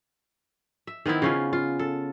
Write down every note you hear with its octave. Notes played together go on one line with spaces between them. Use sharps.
E5
D#3 B3 C4 E4
C#3 C#4 F4
F4
A4